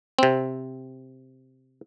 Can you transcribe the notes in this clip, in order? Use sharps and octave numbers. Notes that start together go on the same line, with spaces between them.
C3 C4